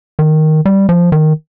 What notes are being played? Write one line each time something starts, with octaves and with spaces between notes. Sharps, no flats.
D#3
G3
F3
D#3